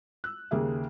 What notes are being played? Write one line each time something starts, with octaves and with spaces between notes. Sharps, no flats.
E6 F#6
D#2 C#3 A#3 G#4 E5